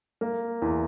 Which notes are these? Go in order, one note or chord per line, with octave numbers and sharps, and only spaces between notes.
A#3
E2